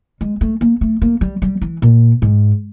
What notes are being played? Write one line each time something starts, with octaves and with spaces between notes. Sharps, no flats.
G#3
A3
A#3
A3
A#3
G3
G3
E3
A#2
G#2